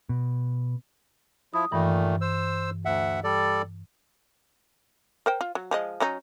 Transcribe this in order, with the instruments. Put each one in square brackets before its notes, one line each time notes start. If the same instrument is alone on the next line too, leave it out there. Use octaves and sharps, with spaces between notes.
[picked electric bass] B2
[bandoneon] F3 E4 [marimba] D#6
[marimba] G2 E3 [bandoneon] A#2 D#3 A3
[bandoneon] C5 E6
D2 E5 F#5
G3 A4 D5
[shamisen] A#4 C5 G5
F4
F#3
F3 G#3 D#5
F#3 C#4 D#4